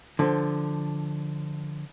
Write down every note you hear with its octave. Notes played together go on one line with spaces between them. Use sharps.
D3 F3